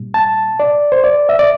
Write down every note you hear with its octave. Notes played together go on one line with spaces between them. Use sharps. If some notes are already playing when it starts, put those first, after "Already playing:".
Already playing: A#2 G3
A5
D5
C5
D5
E5
D5